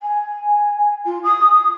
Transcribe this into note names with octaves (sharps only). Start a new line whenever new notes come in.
G#5
F4
D#6